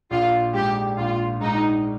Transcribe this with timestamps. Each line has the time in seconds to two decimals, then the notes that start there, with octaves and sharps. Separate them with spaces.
0.11 A#1 F4
0.54 G#2 G4
0.98 A#1 F4
1.41 G#2 D#4